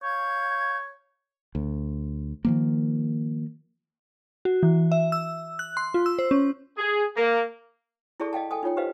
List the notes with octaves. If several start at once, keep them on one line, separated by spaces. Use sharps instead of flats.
C#5 F5 G6 G#6
D2
D#3 F3 A#3
F#4
E3
E5
E6
F#6
C6
F4
E6
C5
C#4
G#4
A#3
E4 G#4 A4 D5 A5 C#6
D#5 F5 G5 A5
A4 G5 G#5 D#6
D#4 F4 C#5 G5
G4 B4 C5 D#5 F5